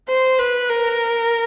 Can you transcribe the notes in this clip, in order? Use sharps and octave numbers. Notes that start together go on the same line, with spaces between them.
C5
B4
A#4